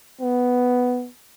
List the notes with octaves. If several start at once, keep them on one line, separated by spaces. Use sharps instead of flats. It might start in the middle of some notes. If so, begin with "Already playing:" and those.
B3